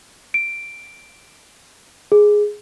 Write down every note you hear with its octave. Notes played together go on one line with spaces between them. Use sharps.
D7
G#4